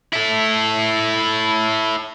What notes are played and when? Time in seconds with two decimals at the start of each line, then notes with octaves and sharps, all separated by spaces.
0.13 E4 A4